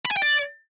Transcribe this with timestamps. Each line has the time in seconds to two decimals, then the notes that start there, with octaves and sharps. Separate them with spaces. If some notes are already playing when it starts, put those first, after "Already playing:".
0.06 B5
0.11 G#5
0.17 G5
0.22 D5